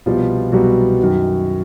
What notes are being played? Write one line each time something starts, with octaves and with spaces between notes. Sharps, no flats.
C2 B2 F3 G3 F4
C2 B2 F#3 G3 F#4
F#2 D#3 F#3